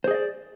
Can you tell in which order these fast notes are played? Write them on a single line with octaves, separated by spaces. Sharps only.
C5 G#4 D#5 D5